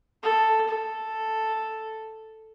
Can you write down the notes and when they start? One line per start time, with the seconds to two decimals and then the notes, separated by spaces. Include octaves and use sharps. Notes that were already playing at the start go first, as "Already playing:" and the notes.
0.23 A4
0.68 A4